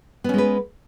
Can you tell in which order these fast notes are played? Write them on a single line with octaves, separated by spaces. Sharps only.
B3 C#4 G#3 B4